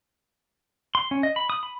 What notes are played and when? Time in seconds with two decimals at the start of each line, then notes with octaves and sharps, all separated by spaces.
0.95 C6
1.11 C#4
1.23 D#5
1.36 B5
1.50 D#6
1.63 B5